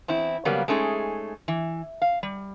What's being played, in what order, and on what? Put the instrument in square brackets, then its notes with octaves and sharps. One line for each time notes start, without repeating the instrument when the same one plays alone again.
[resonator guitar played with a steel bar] E2 C4 E4
C#3 F#3 G3 A#3 B3
G#3 A3 C#4 D#4 G#4
E3
F5
G3